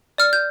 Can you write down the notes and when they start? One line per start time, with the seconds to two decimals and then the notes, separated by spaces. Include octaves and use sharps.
0.18 D5 F6
0.33 G6